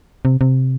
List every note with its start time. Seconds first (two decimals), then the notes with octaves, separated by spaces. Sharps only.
0.25 C3
0.41 C3